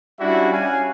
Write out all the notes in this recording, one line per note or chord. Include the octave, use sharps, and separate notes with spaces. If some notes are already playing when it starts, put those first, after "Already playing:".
G3 C#4 D4 E4 F#4 E5
C#4 F5 F#5 G#5